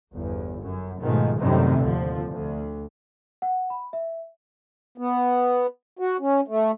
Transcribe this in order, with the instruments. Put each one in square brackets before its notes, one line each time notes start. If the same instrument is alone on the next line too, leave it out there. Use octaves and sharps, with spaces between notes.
[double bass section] G1 E2
F#2
G#2 B2 D#3 F3 G#3 A3
F#2 A2 C3 D#3 G3 C4
D#2 D3 F3
D2
[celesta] F#5
B5
E5
[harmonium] B3
F#4
C#4
A3